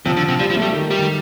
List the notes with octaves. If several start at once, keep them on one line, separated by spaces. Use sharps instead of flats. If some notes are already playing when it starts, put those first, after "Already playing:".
C3 F3
D3
C3
F3 G3
F3
A3
G3
D#3
G3
D#3